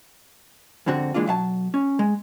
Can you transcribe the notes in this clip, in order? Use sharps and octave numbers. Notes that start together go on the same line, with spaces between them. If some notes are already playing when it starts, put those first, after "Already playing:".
F2 G#2 D3 C4 F#4
E3 G#3 A#3 D4 F4
B1 F#3 F5 A5
C#4
G#3